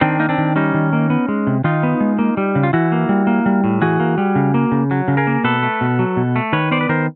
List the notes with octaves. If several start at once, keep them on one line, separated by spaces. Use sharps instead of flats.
D#3 C4 D4
A#3 D#4
C4 D4
D#3
G3 C#4 D#4
D#3
A#3
B3
G#3
C3
D#3 D#4 F4
B3
G#3
A#3
G3
C#3
F4
E3 E4 F#4
A#3
G3
A#3
G3
A2
E3 F#4 G#4
A#3
G3
C#3
A#3
C#3
F#3
C#3
G#4 A#4
A#3
B2 A4 B4
A3
B2
F#3
B2
A3
D#3 B4 C#5
B3 C5 D5
B4
D#3 A#4 C5